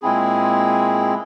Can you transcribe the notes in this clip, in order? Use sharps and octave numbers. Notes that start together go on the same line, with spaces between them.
A#2 G#3 C4 E4 G#4